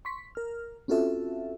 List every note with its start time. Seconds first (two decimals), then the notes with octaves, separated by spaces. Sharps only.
0.05 C6 C#6 B6
0.35 A#4 F6
0.88 C4 C#4 F4 F#4 A4 E5